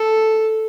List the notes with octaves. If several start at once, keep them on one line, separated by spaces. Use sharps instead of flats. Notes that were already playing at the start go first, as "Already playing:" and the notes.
Already playing: A4